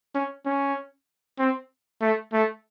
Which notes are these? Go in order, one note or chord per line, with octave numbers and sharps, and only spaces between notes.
C#4
C#4
C4
A3
A3